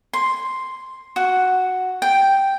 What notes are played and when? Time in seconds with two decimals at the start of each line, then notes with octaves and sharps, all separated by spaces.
0.13 C6
1.16 F#4
2.02 G5